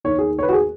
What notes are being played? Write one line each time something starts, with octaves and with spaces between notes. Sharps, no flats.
D#2 D#3 C#5
G#4
C#5
B4
F#4
G#4